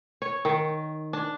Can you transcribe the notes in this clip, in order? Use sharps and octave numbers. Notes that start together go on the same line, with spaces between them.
C#5
D#3
D4